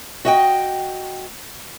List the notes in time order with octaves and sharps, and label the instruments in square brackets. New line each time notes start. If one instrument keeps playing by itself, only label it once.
[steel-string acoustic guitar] F#4 D#5 G5